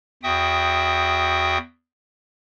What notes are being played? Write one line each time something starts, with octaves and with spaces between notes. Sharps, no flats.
E2 F#4 E5 G5 D#6